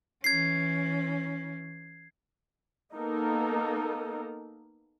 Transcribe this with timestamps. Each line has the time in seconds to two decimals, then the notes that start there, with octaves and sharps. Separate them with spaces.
0.24 E3 C#4 G#6 C7
2.93 A#3 B3 D#4 A4 A#4